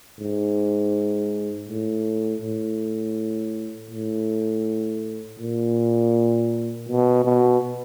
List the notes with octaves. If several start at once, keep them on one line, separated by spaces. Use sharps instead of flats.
G#2
A2
A2
A2
A#2
B2
B2